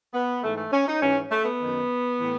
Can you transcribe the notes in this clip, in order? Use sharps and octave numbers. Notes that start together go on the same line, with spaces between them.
B3
G#2 E3 A3
A3
C#4
D#4
G#2 E3 C#4
A3
B3
F#2 D#3
A2 E3